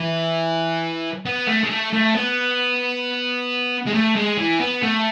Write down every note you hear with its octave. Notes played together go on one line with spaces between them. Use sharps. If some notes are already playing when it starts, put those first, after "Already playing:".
Already playing: E3
B3
A3
G#3
A3
A3
B3
G#3
A3
G#3
E3
B3
A3